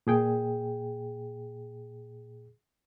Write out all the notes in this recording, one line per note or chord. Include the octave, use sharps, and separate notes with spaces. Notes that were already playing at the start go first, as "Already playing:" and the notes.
A#2 G#4 G5